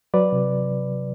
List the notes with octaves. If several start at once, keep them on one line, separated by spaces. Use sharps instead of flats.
F#3 B4 D5
C3